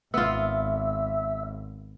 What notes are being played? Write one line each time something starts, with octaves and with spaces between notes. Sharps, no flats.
G#1 B3 F4 E5